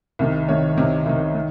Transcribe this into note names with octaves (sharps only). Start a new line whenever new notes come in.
C2 C3 D#3
C2 C3 D#3 C#5
C2 C3 D#3
C2 C3 D#3
D#3